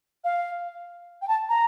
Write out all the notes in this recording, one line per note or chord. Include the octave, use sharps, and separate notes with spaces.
F5
G5
A5
A#5